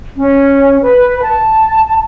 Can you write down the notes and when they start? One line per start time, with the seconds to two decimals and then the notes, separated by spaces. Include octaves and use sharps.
0.17 C#4
0.82 B4
1.23 A5